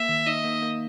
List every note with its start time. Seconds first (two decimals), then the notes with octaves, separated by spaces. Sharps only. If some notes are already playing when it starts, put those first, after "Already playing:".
Already playing: A#3 E5
0.09 D#3
0.27 D#4 D#5
0.44 A#3
0.63 A#3